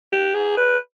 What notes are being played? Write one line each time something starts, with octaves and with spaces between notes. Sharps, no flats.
G4
G#4
B4